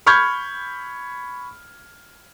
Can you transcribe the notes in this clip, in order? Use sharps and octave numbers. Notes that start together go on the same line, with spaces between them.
B5 C#6 F6 G6 G#6